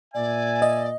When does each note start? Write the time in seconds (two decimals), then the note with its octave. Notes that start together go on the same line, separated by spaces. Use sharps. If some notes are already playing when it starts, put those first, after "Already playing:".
0.14 A#2 D5 E5 G#5
0.62 D#5